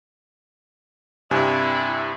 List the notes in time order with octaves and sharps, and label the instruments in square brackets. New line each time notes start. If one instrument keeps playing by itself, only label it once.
[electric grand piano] G2 C3 G#5 [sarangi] E4